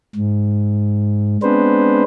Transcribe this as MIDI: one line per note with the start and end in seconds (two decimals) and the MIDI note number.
0.16 1.37 44
1.43 2.03 56
1.43 2.03 59
1.43 2.03 60
1.43 2.03 62
1.43 2.03 71
1.43 2.03 72